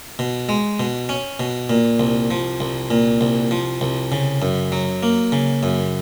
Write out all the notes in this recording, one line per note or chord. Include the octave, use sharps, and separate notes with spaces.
B2
G#3
B2
C#4
B2
A#2
C2
F3
C2
A#2
C2
F3
C2
C#3
F#2
F#3
A#3
C#3
F#2